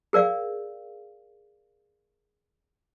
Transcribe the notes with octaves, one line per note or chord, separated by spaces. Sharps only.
G#4 A#4 D5 F5